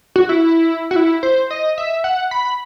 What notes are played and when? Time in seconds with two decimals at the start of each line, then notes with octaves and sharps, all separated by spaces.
0.16 F#4
0.29 E4
0.91 F#4
0.96 E4
1.23 C5
1.51 D#5
1.78 E5
2.04 F#5
2.31 B5